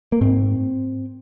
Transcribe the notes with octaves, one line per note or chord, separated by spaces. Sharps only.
A#3
G#2 C4